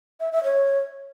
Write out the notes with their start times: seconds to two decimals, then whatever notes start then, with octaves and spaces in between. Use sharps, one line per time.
0.20 E5
0.32 E5
0.44 C#5